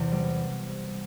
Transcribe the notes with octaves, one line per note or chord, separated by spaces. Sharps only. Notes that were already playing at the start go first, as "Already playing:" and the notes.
Already playing: E2 C3 E3 C5
G3